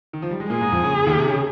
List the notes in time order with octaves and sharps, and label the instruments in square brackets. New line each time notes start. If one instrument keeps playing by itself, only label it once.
[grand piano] D#3
F3
G3
G#3
[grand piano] A#2 A#3 [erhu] G#4
[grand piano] G#2 G#3
F2 F3
C#3
C#3
D#2 D#3
C3
C#3